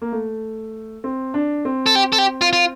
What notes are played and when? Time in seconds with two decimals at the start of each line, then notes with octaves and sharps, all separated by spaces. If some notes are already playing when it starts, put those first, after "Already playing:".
0.02 A#3
0.12 A3
1.04 C4
1.34 D4
1.65 C4
1.86 A4
1.95 G4
2.12 A4
2.18 G4
2.41 F4
2.53 F4